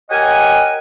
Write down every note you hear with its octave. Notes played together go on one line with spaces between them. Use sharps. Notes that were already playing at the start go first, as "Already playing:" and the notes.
G4 A#4 C#5 D#5 F#5 G#5